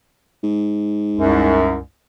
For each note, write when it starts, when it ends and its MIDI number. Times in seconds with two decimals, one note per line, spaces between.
0.43 1.83 44
1.16 1.77 36
1.16 1.77 42